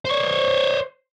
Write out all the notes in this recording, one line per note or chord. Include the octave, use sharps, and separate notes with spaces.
C5 C#5